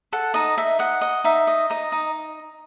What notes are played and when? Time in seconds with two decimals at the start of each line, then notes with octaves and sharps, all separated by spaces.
0.13 A4 F#5
0.34 D#4 D#5
0.57 D#4 E5
0.79 D#5 F#5
1.01 D#5
1.24 D#4 E5
1.47 D#5
1.70 D#4 D#5
1.92 D#4